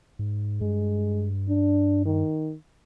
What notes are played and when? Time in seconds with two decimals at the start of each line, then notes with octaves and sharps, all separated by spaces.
0.19 G#2
0.61 G2 G#3
1.49 D4
2.05 D#3